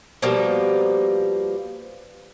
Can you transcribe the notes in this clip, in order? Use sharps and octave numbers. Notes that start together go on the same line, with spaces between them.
B2 F3 G3 A#3